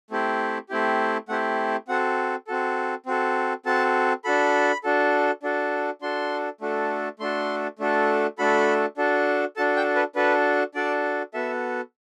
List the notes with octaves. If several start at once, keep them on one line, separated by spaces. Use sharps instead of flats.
A3 C4 E4 G4
A3 C4 E4 G4
A3 C4 E4 G4 F#5
C4 F#4 A4 F#5
C4 F#4 A4
C4 F#4 A4
C4 F#4 A4 A5
D4 F#4 A4 B5
D4 F#4 A4
D4 F#4 A4
D4 F#4 A4 C6
A3 D4 F#4 A4
A3 D4 F#4 A4 C6
A3 D4 F#4 A4
A3 D4 F#4 A4 B5
D4 F#4 A4
D4 F#4 A4 A5
G5
B4
D4 F#4 A4 B4
D4 F#4 A4 D5
B3 F#4 A4 E5